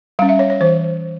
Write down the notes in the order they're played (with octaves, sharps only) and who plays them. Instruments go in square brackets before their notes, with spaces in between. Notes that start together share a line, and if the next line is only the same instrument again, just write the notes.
[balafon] G3 F5
C#4
E5
C#5
C#5
E3 C5